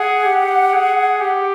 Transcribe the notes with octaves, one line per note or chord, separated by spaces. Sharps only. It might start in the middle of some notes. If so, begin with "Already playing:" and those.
Already playing: G#4 F#5
G4
G#4
G4